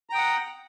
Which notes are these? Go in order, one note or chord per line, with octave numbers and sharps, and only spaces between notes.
F#5 G5 A#5 D#6